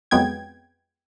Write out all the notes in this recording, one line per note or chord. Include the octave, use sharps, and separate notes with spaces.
F2 F#3 G#3 B3 G5 G#6